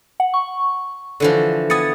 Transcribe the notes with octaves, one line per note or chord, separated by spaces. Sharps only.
F#5
C#6
D3 E3 F3
B3 G#5 D#6 A6 C#7